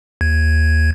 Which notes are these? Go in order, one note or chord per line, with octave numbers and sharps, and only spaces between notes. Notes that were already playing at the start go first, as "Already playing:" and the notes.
D#2 G#6